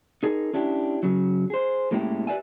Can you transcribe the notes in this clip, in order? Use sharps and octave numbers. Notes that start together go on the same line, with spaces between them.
D#4 G#4 A#4
C#4 D4 E4 G4
F#2 C#3 F#3
G#4 C5
A2 G#3 A#3 C#4 E4 G4
G4 B4 C#5 D5 E5 G#5